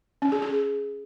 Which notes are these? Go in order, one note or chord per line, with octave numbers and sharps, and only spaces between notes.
C#4
G#4
G#4